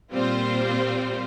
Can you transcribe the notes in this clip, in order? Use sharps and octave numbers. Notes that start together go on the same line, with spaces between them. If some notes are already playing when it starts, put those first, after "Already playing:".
A#2 G3 C4 F4 C5